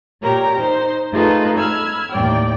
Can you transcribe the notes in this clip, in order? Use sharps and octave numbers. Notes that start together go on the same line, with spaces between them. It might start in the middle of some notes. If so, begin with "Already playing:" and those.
A#2 G4 A#4 C#5 A#5
D#4 C5
A3 D#4 F4 G#4 A4 B4
B5 E6 F6 G#6
D#2 A2 D5 G5